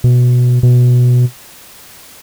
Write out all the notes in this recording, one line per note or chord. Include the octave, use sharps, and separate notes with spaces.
B2
B2